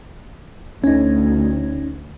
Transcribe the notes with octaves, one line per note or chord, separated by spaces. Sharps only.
D2 C#4 D#4